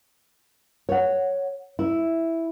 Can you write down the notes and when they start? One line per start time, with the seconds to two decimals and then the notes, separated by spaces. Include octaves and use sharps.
0.89 C#5 F#5
1.79 E4